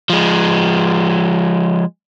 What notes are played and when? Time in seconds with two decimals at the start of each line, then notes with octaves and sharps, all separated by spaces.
0.10 F3 G#3